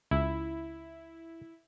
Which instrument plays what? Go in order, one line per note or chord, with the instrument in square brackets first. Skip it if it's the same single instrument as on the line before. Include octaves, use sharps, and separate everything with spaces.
[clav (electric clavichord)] C#2 [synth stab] E4